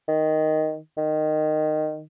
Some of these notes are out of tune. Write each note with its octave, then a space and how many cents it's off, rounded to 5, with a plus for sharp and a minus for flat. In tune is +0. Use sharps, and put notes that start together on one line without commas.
D#3 +0
D#3 -15